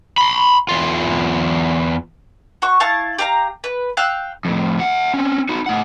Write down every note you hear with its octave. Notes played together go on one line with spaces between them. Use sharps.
B5 C6
E2 F4
F#4 C#6
E4 F5 A5 C#6
G4 F5 A#5
B4
F5 G5 E6 F#6
F2 A2
E5 F#5
C4 C#4
D#4 F#4
A2 F#5